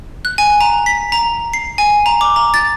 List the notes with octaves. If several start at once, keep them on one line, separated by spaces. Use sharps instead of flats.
F#6
G#5
A#5
B6
A#5
C7
G#5
A#5
D6
A#5
A6